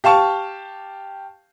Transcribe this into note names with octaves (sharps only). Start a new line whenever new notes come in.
G4 F5 A5 C#6